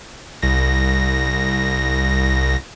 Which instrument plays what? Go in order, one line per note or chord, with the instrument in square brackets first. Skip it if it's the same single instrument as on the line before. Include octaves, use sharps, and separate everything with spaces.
[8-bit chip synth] C2 A#6